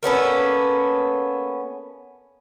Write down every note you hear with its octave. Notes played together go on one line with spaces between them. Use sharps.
A#3 B3 C#4 A4